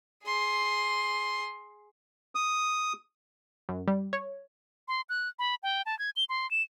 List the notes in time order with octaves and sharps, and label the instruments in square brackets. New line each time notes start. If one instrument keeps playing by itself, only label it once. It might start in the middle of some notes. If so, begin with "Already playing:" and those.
[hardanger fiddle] G#4 C6
[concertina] D#6
[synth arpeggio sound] F#2
G3
C#5
[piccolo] C6
F#6
B5
G5
A5
G#6
G7
C6
E7